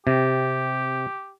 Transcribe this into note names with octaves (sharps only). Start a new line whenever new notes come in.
C3 G4